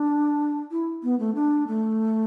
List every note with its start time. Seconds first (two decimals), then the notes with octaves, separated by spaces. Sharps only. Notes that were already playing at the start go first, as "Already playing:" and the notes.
Already playing: D4
0.71 E4
1.03 B3
1.19 A3
1.35 D4
1.68 A3